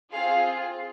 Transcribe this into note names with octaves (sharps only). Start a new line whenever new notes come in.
C4 F4 G#4 F5